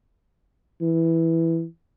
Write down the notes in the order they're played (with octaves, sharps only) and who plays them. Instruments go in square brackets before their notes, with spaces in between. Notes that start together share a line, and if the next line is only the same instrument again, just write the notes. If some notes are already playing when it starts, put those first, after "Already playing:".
[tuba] E3